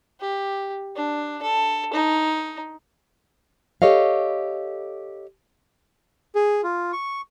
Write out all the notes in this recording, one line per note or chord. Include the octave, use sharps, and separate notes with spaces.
G4
D4
A4
D#4
G4 A4 C#5 D#5 F5
G#4
F4
C#6